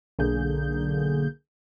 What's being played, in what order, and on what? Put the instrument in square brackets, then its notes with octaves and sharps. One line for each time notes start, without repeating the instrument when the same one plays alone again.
[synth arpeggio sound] B1 D3 A#3 G#4 G6